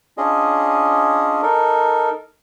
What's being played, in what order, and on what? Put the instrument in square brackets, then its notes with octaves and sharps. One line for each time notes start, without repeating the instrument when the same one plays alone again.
[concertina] C#4 D4 F4 G#4 D#5
D#4 A4 A#4